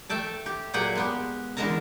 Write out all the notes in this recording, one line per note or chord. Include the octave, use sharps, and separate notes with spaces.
A3 E5 G5 A5
G4
A#2 F#3 G4 G#4 F#5 G5
G#3 B3 G4
D3 E3 G#3 A#4 A5 A#5